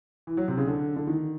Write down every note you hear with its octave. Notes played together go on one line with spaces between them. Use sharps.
E3
F#3
C3
C#3
D3
D3
D#3